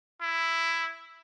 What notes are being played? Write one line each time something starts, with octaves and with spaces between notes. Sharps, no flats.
E4